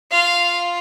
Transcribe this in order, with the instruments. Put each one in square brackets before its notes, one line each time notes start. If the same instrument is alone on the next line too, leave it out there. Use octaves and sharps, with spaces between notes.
[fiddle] F4 [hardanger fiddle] F5